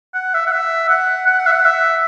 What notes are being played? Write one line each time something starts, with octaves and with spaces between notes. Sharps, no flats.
F#5
E5
F#5
E5
F#5
F#5
F#5
E5
F#5
E5